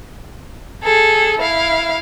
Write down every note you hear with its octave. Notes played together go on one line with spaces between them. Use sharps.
G#4 A4
E4 F5